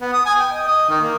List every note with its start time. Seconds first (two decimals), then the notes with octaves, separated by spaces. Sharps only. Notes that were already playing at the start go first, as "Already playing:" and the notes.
0.01 B3
0.13 D#6
0.26 G#5
0.39 G5
0.52 D#5
0.68 D#5
0.89 D#3
1.01 A#3